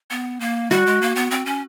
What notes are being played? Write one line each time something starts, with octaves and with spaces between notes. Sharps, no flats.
B3
A#3
G3 F#4
G#3
A#3
B3
C4
C#4